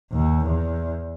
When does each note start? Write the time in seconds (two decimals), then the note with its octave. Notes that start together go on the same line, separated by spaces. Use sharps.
0.12 D#2
0.45 E2